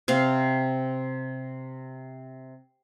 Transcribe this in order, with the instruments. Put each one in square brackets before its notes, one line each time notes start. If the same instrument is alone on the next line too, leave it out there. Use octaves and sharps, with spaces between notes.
[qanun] C3 C4 F5